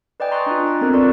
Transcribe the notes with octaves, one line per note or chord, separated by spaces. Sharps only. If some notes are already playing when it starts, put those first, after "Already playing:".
B4 D5 D#5 G5 G#5
A#5 C6 C#6 D#6 F#6 A6
D4 F4
A#5
B3 C4 A4 A#4 F#6
F4 A4 B4 D5 C6 C#6